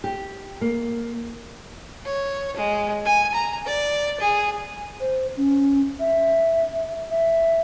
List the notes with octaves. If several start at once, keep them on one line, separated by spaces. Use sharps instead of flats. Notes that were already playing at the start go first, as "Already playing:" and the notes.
G4
A#3
C#5
G#3
G#5
A#5
D5
G#4
C5
C#4
E5
E5